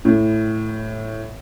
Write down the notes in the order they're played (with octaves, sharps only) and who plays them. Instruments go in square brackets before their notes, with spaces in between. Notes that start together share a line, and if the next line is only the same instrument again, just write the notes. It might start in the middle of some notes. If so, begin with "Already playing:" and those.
[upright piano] A2